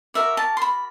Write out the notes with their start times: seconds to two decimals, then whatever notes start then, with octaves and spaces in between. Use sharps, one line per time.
0.14 F#4 A#4 D5 E5
0.37 A5
0.57 C6
0.62 B5